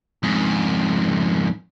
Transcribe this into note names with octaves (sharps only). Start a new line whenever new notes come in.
F2 G#2